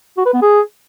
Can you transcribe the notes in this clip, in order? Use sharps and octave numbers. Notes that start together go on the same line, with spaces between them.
F#4
B4
B3
G#4